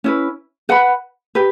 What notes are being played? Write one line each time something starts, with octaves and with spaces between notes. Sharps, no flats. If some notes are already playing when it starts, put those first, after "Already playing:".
C#4 E4 B4
B4 F#5 B5
G4 B4